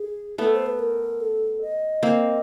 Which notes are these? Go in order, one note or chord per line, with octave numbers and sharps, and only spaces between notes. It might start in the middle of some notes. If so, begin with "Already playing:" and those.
Already playing: G#4
A3 B3 A4
C5
B4
A#4
A4
D#5
A#3 C4